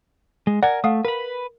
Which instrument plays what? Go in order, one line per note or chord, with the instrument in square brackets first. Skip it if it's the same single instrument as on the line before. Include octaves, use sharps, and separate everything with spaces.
[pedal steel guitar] G#3
[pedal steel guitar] A#4 G#5 [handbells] D5 F#5
[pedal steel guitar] A3 [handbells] F5 F#5 D#6
[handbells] A#4 [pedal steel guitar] B4 B5